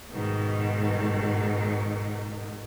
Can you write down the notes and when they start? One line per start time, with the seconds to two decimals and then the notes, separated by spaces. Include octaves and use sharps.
0.11 G#2 B2 D#3